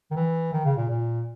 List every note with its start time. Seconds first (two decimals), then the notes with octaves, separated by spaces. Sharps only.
0.11 D#3
0.16 E3
0.53 D#3
0.65 C#3
0.77 A#2
0.89 A#2